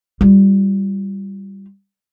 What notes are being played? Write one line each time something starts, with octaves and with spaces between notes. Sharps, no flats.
G3 F4